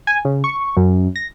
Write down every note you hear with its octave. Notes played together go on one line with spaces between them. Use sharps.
G#5
C#3
C#6
F#2
A#6